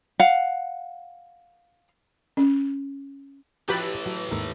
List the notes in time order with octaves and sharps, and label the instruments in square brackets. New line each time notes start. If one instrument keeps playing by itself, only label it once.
[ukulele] F5 F#5
[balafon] C#4
[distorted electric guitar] A2 E3 [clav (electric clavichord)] F3 F#4 A#5 [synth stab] G4 B4 A6
[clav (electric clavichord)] F#3
D#2 G#2 A#4